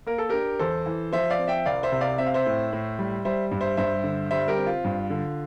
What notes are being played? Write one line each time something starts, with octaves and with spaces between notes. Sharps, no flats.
A#3 A#4
A4
D4 G4 A#4
E2 A4 C5
E3
F3 C5 E5
D5 F5
C4
E5 G5
C2 D5 F5
C5 E5
C3
D5 F5
C4 E5
F5
C5 E5
A2
A2
G3
G3 C5 E5
G2
C5 E5
G2 C5 E5
D3
G3 C5 E5
G4 A#4
C4
F4
G2
D3